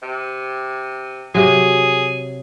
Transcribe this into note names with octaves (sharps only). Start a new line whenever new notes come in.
C3
C3 F#3 G#4